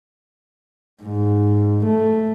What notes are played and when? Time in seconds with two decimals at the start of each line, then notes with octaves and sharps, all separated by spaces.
1.03 G#2
1.86 A3